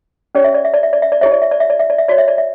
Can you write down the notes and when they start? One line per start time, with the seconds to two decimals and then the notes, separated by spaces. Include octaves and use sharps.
0.35 C#4 G4 C#5 D5
0.44 E5
0.54 D5
0.65 E5
0.74 D5
0.83 E5
0.93 D5
1.02 E5
1.12 D5
1.21 E4 G4 C#5 E5
1.32 D5
1.42 E5
1.51 D5
1.60 E5
1.70 D5
1.79 E5
1.90 D5
1.98 E5
2.08 F#4 C#5 D5
2.18 E5
2.28 D5
2.38 E5